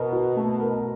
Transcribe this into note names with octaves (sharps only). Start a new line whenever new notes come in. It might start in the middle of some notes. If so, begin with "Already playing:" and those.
Already playing: B2 A#4
F#4
A3
A#4